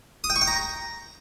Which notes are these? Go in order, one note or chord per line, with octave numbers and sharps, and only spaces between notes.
D#6
G5
C#6
G5
A#5